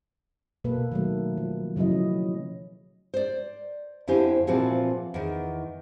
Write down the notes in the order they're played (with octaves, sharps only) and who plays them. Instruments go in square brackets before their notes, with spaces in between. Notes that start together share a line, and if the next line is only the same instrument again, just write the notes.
[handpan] B2 A#3 A4 B4
D#3 F#3 A3
F3
C#3 F#3 C#4 E4 D#5
F3
[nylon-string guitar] C5 D5
F2 D3 E4 G4 C5 G#5
A#2 E3 F3 C4 F#4 G#4
E2 D#3